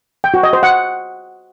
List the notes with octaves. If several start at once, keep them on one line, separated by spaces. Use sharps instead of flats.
G5
F#4
D#5
C5
F#5